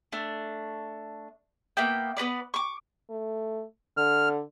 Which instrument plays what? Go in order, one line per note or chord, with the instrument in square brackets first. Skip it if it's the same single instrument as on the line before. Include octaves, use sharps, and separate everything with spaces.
[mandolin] A3 D4
A#3 B3 E4 G5
B3 F#4 B4 D5
C#6 D6
[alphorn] A3
[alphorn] D3 [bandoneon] F6